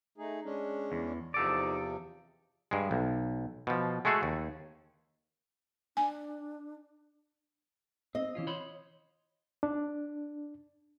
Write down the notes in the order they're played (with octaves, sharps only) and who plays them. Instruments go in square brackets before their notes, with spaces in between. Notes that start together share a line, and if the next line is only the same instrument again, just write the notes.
[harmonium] A3 D#4 G#4
G#3 C#4 D4
[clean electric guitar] E2
[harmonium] E2 C3 F3 [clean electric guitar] D#4 A4 D5
[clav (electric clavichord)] G2 G#3
B1
B2 F3
G#3 A3 F#4 G#4 A4
D#2
[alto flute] D4 [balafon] G#5
[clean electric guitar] C4 [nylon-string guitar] D#5
[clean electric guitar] E3 C#4 F4
C#5 B5 C6
[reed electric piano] D4